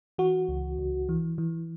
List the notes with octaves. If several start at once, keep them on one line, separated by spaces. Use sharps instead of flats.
E3 F#4
C#2
C#2
E3
E3